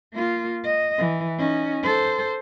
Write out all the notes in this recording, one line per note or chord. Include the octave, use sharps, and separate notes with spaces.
A#3 F4
D#5
E3
C#4 D#4
A4 C5